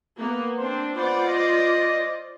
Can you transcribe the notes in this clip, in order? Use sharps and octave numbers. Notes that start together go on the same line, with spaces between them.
A#3 B3
C4 D4 C5
B3 F4 C5 D5
D#5